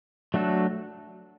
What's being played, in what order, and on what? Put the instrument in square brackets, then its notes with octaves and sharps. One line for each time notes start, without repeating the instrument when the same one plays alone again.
[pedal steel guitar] F#3 A3 D4 F#4 A4